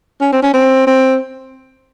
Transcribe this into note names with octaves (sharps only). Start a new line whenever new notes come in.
C#4
C4
C#4
C4
C4